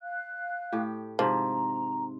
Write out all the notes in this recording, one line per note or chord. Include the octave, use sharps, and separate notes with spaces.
F5 F#6
A2 G4
G#2 C3 F3 A#5